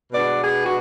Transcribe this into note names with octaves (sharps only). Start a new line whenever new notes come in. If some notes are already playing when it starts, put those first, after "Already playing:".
B2 G#3 B3 D4 D5
G#4
F#4